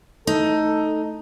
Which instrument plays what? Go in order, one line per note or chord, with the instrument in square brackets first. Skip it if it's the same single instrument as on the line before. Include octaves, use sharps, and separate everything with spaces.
[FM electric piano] A3 [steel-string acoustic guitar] D#4 [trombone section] A4